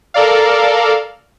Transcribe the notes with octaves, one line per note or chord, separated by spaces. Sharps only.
A4 A#4 D5 F5